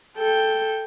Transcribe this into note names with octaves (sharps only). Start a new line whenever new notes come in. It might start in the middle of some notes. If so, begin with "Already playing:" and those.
A4 G5